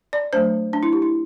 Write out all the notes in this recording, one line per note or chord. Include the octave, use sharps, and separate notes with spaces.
D5
F#3 A3 D4 C5
D4
E4
G4
E4